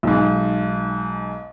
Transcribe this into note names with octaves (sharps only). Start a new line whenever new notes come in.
B1 G#2